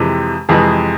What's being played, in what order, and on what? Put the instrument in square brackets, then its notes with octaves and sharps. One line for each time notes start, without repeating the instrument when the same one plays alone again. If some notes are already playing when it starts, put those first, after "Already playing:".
Already playing: [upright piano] F2 C3 E3 G#3
F2 C3 E3 G#3 G#4